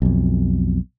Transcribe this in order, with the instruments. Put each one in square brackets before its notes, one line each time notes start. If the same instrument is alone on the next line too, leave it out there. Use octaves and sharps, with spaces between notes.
[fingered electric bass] B1 F2